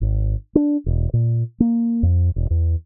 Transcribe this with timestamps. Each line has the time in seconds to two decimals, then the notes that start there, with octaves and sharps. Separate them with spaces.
0.01 G#1
0.55 D4
0.86 E1
1.13 A#2
1.60 A#3
2.03 F2
2.36 E1
2.50 E2